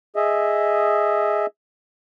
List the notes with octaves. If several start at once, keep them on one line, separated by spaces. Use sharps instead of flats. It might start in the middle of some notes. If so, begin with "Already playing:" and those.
G#4 D#5 E5